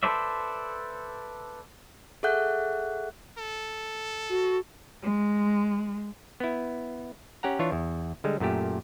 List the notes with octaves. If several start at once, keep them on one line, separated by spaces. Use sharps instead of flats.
A4 B4 C5 D5 E5
G#4 A4 E5 F#5 F#6 G6
A4
F#4
G#3
B3 E4
C#4 G4 F#5 A#5
E3 D4 F4 C#5
E2
D3 G3 G#3
F#2 A#2 A3 G4